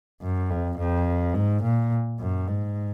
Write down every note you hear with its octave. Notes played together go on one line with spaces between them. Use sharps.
F#2
F2
F2
G#2
A#2
F#2
G#2